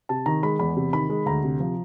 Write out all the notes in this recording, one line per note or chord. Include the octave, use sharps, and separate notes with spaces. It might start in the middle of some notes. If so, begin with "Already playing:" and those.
C3 A5
D#3 A#5
G#3 B5
E2 B5
C3
D#3 B5
G#3
D2 A#5
C3
F3